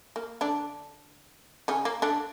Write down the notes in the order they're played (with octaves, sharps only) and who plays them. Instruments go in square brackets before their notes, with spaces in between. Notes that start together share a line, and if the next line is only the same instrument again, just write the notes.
[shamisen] A#3
D3 D4
C#3 C#4
A#3
D3 D4